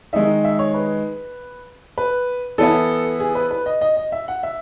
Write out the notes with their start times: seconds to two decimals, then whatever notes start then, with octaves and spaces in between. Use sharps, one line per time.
0.13 D#3 G#3 D#4 E5
0.44 E5
0.59 C#5
0.74 B4
1.98 B4
2.58 E3 B3 E4 A4
3.20 G#4
3.35 B4
3.51 B4
3.66 D#5
3.81 D#5
3.97 D#5
4.12 E5
4.28 F#5
4.43 E5